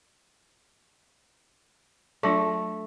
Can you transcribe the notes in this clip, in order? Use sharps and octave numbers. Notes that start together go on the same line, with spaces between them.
F#3 A3 D4 F4